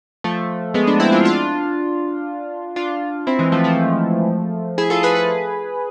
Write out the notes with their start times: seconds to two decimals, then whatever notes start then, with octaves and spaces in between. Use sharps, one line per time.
0.24 F3 A3
0.74 G#3 B3
0.87 B3 D4
1.00 C4 E4
1.12 D4 F4
1.25 D4 F4
2.76 D4 F4
3.27 C4 E4
3.39 E3 G#3
3.52 F3 A3
3.64 F3 A3
4.78 E4 G#4
4.90 F4 A4
5.03 G#4 B4
5.15 G#4 B4